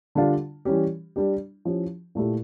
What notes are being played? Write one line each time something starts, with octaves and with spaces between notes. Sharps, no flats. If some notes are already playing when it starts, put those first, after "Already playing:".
D3 G3 D4 F4
E3 G3 C#4 G4
G3 D4 G4
F3 C#4 E4 G4
A#2 A3 E4 G4